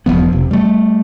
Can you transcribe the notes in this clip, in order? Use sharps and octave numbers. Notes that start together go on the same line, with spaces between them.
E1 G2 F3 B3
F1 C3
G3 A3